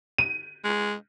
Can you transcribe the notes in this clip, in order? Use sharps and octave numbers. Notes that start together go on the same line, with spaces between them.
D#7
G#3